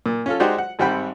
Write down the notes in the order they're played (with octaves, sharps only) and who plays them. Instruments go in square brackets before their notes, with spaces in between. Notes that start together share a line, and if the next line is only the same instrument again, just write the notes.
[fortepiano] A#2
C#4 F4 A4
G#3 D#4 F#4 G4 C5 D5
F#5
G#1 G3 C4 F#5 G5 B5